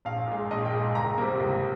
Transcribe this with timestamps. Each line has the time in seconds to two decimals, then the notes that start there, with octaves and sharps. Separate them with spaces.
0.05 A#1 F5
0.27 A#2 G#3
0.51 A#1 D#5
0.65 G5
0.73 A#2 G#3
0.95 C#2 A#5
1.18 C3 G3 A#3
1.40 C#2